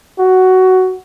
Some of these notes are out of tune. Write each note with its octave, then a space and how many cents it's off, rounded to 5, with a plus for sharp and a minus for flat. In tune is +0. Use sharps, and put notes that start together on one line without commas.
F#4 +10